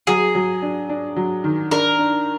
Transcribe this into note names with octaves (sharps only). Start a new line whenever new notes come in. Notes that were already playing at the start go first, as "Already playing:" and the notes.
F#3 G#4
F#3
D4
D4
F#3
D#3
D4 A#4
D4